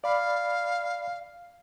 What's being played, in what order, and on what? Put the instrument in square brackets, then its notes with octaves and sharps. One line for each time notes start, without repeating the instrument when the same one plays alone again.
[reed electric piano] D5 B5 [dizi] F5